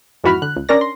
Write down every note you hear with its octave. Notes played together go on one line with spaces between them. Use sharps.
F2 G#2 E3 F#4 B5 F6
D3 F#6
C#2
C#4 D4 A#4 D5 A#6
C6